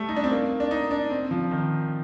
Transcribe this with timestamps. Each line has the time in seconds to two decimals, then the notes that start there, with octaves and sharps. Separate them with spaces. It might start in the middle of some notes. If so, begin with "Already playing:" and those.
Already playing: G3 A3
0.09 D#4
0.16 D4
0.24 C4
0.31 A#3
0.60 D4
0.71 D#4
0.91 D4
1.10 C4
1.31 F3
1.51 D#3